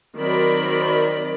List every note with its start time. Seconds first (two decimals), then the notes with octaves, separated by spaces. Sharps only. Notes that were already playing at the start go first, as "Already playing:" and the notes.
0.17 D#3 F#3 C4 A#4 D5 B5